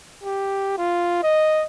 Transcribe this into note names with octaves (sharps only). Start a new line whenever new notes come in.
G4
F4
D#5